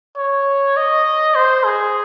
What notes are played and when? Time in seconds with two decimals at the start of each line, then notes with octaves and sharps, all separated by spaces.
0.17 C#5
0.77 D#5
1.35 C5
1.64 G#4